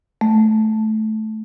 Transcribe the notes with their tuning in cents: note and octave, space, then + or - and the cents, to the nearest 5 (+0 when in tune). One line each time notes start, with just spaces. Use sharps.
A3 -15